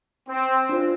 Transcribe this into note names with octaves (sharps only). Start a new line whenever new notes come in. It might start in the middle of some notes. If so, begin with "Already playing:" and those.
C4
D4 F4 C5